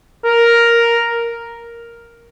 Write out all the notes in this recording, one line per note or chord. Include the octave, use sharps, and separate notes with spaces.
A#4